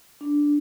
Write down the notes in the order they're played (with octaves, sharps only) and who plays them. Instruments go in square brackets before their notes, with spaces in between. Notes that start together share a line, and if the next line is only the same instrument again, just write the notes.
[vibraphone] D4